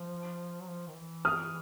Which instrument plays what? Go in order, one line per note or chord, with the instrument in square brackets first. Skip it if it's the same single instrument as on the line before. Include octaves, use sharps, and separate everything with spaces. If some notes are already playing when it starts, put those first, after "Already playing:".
Already playing: [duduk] F3
F#3
F3
D#3
E3
[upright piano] D#6 F6